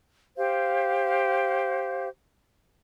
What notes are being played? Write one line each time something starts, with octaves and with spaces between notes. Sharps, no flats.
G4 C5 F5